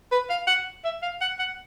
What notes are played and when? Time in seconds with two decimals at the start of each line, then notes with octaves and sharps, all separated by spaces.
0.12 B4
0.30 F5
0.47 F#5
0.85 E5
1.02 F5
1.21 F#5
1.39 F#5